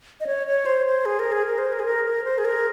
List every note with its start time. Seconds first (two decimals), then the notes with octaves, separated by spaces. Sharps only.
0.20 D#5
0.27 C#5
0.47 C#5
0.66 C5
0.86 C5
1.06 G#4
1.19 A#4
1.32 G#4
1.46 A#4
1.58 C5
1.73 A#4
1.79 G#4
1.86 A#4
2.05 A#4
2.24 C5
2.38 G#4
2.45 A#4